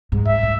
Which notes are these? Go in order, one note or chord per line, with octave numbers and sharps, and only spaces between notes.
G#2
E5
A2